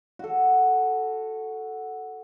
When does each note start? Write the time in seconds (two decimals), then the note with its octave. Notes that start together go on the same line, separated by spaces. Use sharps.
0.19 F#4 A4